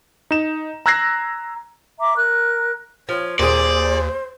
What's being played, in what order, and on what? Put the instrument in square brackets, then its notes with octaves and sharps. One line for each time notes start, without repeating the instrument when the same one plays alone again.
[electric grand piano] D#4 E7
A#5 E6 F#6 G#6 A#6 C7
[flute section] E5 A#5 D6
A#4 F#6
[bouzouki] F3 [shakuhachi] C#5
[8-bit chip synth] D#2 [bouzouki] A#2 G#4 [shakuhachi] C5 [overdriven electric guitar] D5